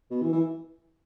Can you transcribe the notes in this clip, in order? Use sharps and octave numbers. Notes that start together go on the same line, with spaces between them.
B2
E3
E3